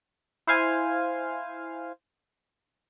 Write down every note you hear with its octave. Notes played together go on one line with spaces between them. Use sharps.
E4 C5 F5 G#5